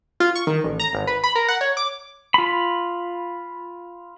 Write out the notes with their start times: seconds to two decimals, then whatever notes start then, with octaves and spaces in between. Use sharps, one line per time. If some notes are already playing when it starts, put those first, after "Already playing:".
0.20 F4
0.36 C#6
0.47 D#3
0.64 A1
0.80 A#5
0.93 G#1
1.07 B4
1.24 B5
1.35 A#4
1.48 F#5
1.61 C#5
1.77 D6
2.34 F4 B5